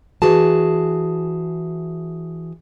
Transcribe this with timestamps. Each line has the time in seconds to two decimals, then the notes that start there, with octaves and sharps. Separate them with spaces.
0.22 E3 F#4 G#4 A5